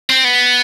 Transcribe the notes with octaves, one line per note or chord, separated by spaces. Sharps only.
C4
B3